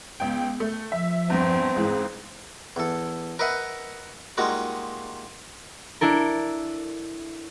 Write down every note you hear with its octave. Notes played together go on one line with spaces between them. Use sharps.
C#2 B3 G5
A3
F3 E5
E2 G2 C4
C#2 G#2 E3 G#4
E2 A4
A#4 B4 D#5 E5 F#5
G3 G#3 A#3 D#4 F4 F#4
D4 E4 A4 A#4